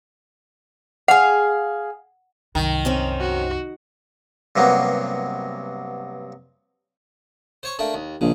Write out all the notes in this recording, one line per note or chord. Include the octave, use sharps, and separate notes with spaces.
G#4 F5 F#5
C2 F#2 D#3
C4 C#4 D#4
F#4
G2 C3 F#3 A#3 B3
C5 C#5 C#6
A3 A#3 D4
D#2
A#1 C#3